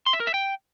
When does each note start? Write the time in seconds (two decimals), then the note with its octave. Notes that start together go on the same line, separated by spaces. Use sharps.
0.06 C6
0.13 E5
0.20 A#4
0.27 E5
0.34 G5